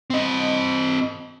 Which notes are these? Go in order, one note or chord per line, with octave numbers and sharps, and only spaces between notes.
C4 D#5